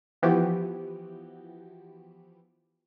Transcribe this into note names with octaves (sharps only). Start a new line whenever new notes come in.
E3 F3 B3 F#4 G4